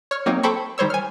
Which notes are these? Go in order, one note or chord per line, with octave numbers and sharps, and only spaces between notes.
C#5 F6
F#3 A#3 C4 D#4 C#5
A4 C5 G5 A5 B5 C#6
D#3 G3 C5 C#5 E6
G#5 F6